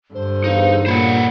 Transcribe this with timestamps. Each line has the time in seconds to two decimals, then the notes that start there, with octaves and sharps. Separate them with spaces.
0.14 G2 D3 C5
0.44 E2 D#4 F5
0.86 A#2 C5 C#5 F#5 B5